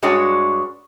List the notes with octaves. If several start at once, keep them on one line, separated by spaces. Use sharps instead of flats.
G2 G#3 D4 F#4 C#5 G#5